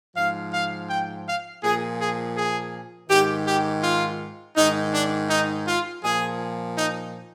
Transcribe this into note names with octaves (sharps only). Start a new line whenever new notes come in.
G#2 F3 F5
F5
G5
F5
A#2 F3 G#4
G#4
G#4
G#2 D#3 G4
G4
F4
G#2 D#3 D#4
D4
D#4
F4
A#2 F3 G#4
D#4